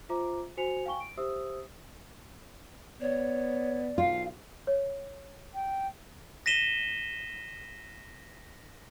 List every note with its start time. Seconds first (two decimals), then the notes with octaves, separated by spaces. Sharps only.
0.09 F4 C5 E5 A#5 D6
0.57 F#4 C5 G#5 C#7 F7
0.86 F5 G5 G#5 C#6 G7
1.00 D7
1.17 G4 C5 E5 D#6 E6
3.01 B3 C#5 D5
3.98 B1 F4 F5
4.67 C#5
5.55 G5
6.46 A#6 B6 D#7 E7 G7